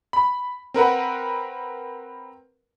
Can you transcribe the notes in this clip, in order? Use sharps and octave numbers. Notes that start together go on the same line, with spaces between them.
B5
C4 A#4 B4 F#5